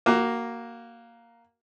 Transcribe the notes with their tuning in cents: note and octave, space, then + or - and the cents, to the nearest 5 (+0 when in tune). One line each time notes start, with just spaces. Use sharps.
A#3 +0 F#4 +20